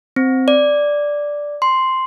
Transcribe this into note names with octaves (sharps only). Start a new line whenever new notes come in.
C4
D5
C6